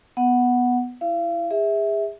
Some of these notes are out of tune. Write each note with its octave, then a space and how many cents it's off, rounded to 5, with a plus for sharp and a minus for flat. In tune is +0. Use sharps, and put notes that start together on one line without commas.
B3 +0 F#5 +0
E4 +10 F5 -35
G#4 -35 E5 -15